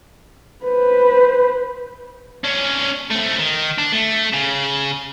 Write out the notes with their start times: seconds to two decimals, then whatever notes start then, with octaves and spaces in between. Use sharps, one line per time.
0.65 B4 C5
2.44 C#4 D4
3.11 A3 C4
3.39 D#3
3.78 D4
3.92 A3
4.33 C#3